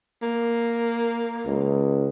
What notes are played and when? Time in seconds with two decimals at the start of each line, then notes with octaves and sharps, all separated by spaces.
0.22 A#3
1.46 C#2